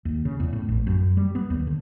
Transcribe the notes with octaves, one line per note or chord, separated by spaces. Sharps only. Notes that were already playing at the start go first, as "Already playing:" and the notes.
D#2
C#3
E2
A2
A1
F#2
G3
B3
D#2
D3